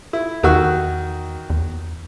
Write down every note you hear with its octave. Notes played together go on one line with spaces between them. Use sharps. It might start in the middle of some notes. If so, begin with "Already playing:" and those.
E4
E2 D#3 F#4 E6
E2